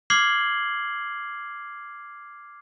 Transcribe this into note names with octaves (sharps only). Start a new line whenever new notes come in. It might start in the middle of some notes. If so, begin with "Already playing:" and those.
D6 F6 G#6 C7 F#7 G7